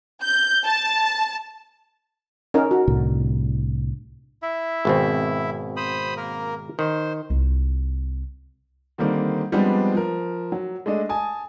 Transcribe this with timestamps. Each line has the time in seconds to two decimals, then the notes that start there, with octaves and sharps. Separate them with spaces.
0.23 G6
0.65 A5
2.54 C#4 D#4 A#4
2.71 F#4
2.88 C2 A2 D3
4.42 E4 E5
4.85 G#1 B2 C4
5.77 C5 B5 D#6
6.17 A#3 A#4
6.79 D#3 C5
7.30 C2 F4
8.98 D3 D#3 G3 A#3 C4
9.52 F3 G3 G#3 B3 C4 D4
9.94 F3 A#4
10.52 F#3
10.86 G#3 A3 D4 D#5
11.09 G#5 A5 D#6